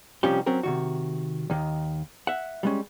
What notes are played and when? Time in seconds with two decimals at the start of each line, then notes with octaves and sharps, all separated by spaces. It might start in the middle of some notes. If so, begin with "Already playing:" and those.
0.23 C3 F3 G3 C#4 D#4 G4
0.46 F#3 C4 C#4 A#4
0.63 C3 D#3 F#4
1.50 D#2 D#3
2.27 E5 F#5
2.63 G3 G#3 C#4